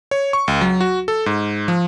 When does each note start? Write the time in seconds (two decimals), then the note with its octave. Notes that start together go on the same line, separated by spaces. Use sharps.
0.11 C#5
0.33 C#6
0.48 C#2
0.61 F#3
0.81 F#4
1.08 A4
1.26 G#2
1.68 F3